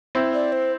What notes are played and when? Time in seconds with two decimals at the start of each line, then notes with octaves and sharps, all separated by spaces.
0.15 C4 E4
0.34 D5
0.53 C5